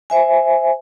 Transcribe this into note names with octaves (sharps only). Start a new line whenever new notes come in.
C5 E5 G#5